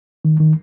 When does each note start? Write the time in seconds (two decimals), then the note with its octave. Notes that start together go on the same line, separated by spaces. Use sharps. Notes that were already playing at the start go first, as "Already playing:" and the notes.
0.25 D#3
0.40 D#3